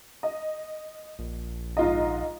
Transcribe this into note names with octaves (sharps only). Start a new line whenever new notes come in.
D#5
A#1
G#2 F4 D#5